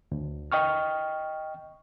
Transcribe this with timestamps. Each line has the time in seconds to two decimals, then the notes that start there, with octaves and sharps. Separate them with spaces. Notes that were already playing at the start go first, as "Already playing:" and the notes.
0.12 D2
0.52 D#5 G5 C#6 F6